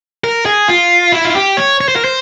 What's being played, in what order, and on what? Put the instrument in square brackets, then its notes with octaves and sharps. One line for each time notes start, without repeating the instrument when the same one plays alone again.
[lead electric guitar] A#4
G#4
F4
E4
F4
G4
C#5
C#5
C5
A#4
C5